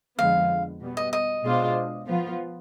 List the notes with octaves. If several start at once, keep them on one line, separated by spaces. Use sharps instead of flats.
F2 D3 F3 G#3 B3 F5
B2 G3 B3
D#5
D#5
B2 G#3 D4 F4 C5
F3 B3 F4